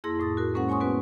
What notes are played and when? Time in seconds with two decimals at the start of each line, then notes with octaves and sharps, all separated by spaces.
0.04 F2 A#3 E4 G#4 C6 A#6
0.18 F2 A2 D#6 A6
0.37 F#4 A#4
0.54 G#3 A#3 C#4 A#4 C5 F#5
0.69 C#5 G#5 C6 C#6 D#6
0.80 A3 B3 C#4 F#4 B4